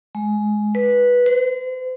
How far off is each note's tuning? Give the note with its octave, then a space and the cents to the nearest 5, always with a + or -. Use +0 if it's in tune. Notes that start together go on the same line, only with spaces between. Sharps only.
G#3 +15
B4 -10
C5 -40